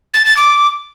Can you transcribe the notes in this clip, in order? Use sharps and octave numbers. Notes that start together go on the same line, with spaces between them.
A6
A6
D6